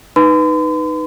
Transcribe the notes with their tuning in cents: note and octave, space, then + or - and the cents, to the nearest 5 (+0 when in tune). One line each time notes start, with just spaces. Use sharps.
D#4 -5 B4 +0 C6 -45